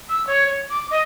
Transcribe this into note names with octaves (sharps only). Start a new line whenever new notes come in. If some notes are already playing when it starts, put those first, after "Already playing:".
E6
C#5
C#5
D6
D#5